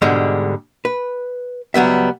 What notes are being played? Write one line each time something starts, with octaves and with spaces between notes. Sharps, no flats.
G#2 B2 D3 G3 G#3
B4
C#2 F#3 G3 B3 E5